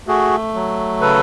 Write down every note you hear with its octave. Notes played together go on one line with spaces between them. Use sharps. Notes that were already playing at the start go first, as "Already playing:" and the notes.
A3 F#4 G#4
F#3
C#3 A4 B4